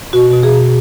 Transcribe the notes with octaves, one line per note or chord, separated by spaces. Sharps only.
B2 F#4
B2
G#4
B2